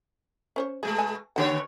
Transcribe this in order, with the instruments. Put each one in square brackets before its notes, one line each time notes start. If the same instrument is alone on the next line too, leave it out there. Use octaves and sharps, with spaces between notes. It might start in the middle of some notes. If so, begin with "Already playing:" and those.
[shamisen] C#4 C5 C#5
[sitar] B2 G#3 A3 [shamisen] G#4
[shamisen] G#5 A5
[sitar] B2 D3 C#5 [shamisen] A#3 G4 F#5